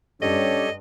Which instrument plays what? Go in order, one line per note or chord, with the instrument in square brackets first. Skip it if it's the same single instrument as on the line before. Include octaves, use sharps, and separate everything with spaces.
[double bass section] G2 [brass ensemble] C#4 D4 [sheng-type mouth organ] G4 A4 C#5 [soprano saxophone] D#5